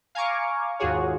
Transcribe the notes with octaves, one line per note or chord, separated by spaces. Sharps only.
F5 G#5 A#5 C#6 D6
D#2 G#2 F4 F#4 G#4 C#5